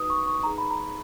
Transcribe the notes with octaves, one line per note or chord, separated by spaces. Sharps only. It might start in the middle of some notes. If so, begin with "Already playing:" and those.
Already playing: D#4 F#4 B4 D#6
C#6
C#6
D#4 G#4 B4 A#5
B5
A#5